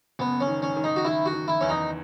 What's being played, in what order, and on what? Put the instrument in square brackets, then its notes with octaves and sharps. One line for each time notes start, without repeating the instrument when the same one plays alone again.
[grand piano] F#1 [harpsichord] B3
[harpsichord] C#4
[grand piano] D#3
[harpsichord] C#4
[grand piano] D#3
[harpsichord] D#4
F#4
[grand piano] D#3 [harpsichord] E4
[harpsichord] F#4
[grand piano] D#3
[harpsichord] E4
[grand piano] E2 [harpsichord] C#4
[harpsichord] D#4